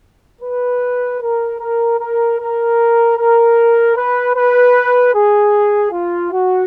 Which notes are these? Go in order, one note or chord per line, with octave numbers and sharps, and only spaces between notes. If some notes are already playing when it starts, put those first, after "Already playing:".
B4
A#4
A#4
A#4
A#4
A#4
B4
B4
G#4
F4
F#4